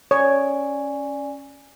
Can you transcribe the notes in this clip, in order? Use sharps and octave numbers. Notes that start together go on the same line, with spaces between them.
C#4 C#5 D5 G#5